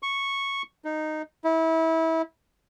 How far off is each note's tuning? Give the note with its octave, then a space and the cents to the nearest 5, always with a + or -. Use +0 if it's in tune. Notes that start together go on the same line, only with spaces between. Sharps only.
C#6 -5
D#4 -10
E4 -25